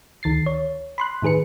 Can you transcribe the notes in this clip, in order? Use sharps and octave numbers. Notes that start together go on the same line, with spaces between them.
D2 D#3 A6 C7
C#5
B5 C6 F#6
A2 D#3 G#4 B4 C#7